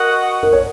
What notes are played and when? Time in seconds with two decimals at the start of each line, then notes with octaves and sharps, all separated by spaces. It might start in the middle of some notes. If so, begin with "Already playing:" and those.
Already playing: F#4 A#4 D#5 F#5
0.43 A#4
0.53 C#5